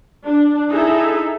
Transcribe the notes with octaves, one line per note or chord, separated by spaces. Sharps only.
D4
D#4 E4 G#4 A4 E5